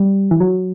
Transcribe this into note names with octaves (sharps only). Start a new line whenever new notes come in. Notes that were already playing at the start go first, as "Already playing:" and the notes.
Already playing: G3
E3
F#3